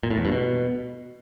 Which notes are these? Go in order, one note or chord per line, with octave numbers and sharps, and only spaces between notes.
A#2
A2
E2
G2
B2